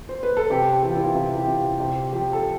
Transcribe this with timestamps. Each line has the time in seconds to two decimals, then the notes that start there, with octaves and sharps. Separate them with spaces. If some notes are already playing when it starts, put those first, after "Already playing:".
0.09 C5
0.23 B4
0.37 A4
0.50 C3 G4
0.82 E3 G4
0.90 F4
0.97 E4
1.04 F4
1.15 C3 E4
1.37 G4
1.47 C3 F4
1.80 C3 G4
2.12 F3 G4
2.33 A4